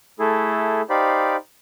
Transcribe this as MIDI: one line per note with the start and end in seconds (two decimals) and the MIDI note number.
0.19 0.82 57
0.19 0.82 64
0.19 0.82 68
0.19 0.82 69
0.90 1.36 63
0.90 1.36 67
0.90 1.36 72
0.90 1.36 74
0.90 1.36 77
0.90 1.36 83